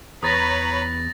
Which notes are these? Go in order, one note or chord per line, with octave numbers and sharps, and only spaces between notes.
E2 B4 C#5 A#5 B5 D#6 A6 A#6